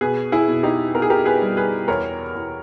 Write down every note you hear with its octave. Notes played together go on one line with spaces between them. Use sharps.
B2 G#4 B4
E4 G#4
B2
D#4 G4
B3 A#4
G#4
G4 A#4
G#4 B4
G3
G#4 B4
E2 A#4 C#5
E2